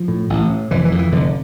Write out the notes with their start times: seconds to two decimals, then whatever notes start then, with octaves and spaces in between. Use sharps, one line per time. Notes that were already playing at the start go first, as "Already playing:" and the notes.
Already playing: F3
0.08 A2
0.30 A1
0.50 A2
0.71 F1 E3
0.85 E3
0.92 F2 D3
0.99 E3
1.12 F1 D3